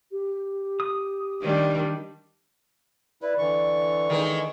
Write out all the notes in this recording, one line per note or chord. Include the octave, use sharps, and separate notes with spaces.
G4
D#6
D#3 G3 D4
E4 B4 D5
D3 E3 C#6
D#3 G#3 D#4